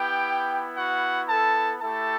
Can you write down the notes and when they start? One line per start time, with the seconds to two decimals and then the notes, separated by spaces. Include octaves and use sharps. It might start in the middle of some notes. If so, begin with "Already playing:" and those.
Already playing: B3 E4 G4 G5
0.77 F#4 F#5
1.29 A4 A5
1.82 A3 E4 G4 A4 A5